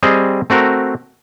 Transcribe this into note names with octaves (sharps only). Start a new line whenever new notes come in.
G3 C4 G#4 C5 D#5
A3 C4 F#4 A#4